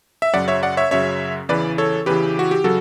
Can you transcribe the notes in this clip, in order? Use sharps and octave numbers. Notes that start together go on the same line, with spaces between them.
E5
F#2 C#3 F#3 D5 F#5
C#5 E5
D5 F#5
C#5 E5
F#2 C#3 F#3 C#5 E5
E2 C#3 E3 B4 D5
A4 C#5
E2 C#3 E3 G4 B4
F#4
G4
C#3 F#3 F#4 A4